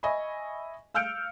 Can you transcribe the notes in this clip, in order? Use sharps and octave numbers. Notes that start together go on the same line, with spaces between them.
D#5 E5 G#5 B5 C#6
F5 E6 F6 G6 C#7 D7